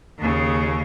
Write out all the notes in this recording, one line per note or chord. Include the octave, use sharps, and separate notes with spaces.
D#2 C#3